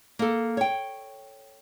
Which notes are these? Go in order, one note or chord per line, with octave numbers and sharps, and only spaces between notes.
A#3 A4
C#5 G5